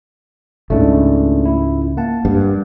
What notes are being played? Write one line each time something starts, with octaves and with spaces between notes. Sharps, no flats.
C#2 G#2 A3 D4 E4
E4
A#3 F#5 A5
G2